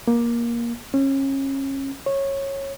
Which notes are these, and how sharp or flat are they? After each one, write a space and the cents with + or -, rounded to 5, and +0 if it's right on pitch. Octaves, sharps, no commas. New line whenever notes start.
A#3 +15
C#4 -30
C#5 -15